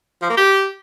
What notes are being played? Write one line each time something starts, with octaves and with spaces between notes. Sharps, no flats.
F3
A#3
G4